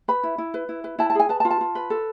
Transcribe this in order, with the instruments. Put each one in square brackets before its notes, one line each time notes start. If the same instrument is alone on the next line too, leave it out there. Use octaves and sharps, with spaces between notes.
[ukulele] B4 B5
E4
E4
B4
E4
B4
E4 A5
A5
G#4 G#5
B4 A5
A5
F4
A5
F4
B4
A4